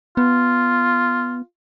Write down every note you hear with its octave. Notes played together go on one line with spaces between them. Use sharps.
B3 F4